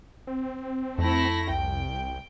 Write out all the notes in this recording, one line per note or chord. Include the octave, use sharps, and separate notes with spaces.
C4
F2 A3 E4 A#6
C2 G5